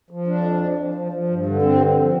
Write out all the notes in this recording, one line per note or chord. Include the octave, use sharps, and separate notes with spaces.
F3
F2 D4
F3
F3
F3
F3
F3
G2
D3
G2 C4
D3
F3